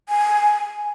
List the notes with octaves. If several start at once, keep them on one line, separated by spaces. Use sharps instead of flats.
G#5